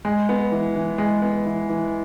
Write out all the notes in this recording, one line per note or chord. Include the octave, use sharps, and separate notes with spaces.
G#3
B3
E3
E3
G#3
B3
E3
E3